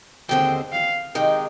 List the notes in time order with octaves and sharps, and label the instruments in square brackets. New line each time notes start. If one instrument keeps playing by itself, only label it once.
[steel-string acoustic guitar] D#2 D3 G#3 C4 [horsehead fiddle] G5
[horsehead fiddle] F5
[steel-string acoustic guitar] C3 D#3 G#3 D#4 [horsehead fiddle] G5